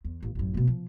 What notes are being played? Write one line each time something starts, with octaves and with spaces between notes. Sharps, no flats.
E2
A1
A1 F#2
B2 A3
F3